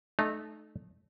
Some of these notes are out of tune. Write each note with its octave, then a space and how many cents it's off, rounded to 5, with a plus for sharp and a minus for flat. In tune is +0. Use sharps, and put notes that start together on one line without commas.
A3 -25 D#4 -25